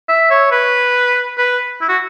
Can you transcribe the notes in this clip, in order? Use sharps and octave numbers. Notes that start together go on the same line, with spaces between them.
E5
C#5
B4
B4
E4
F#4